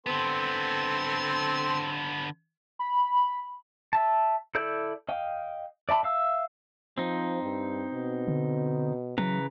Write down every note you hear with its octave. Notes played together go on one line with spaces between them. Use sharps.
D3 B3 C4 A4 C6
B5
E5 A5
E4 A4 D5 G6
D#5 F5 G5
D5 E5 A5 B5
E5 F5 E6
F3 C4 D#4
G2
B2
D3
C#3 E3 F#3 B4 A#5